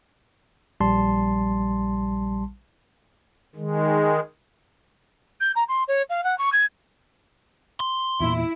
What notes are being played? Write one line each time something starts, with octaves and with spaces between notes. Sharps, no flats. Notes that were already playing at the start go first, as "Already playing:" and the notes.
A#1 G3 A5 C6
D#3 G#3
G6
A#5
C6
C#5
F5
F#5
C#6
G#6
C6
E2 A#2 E4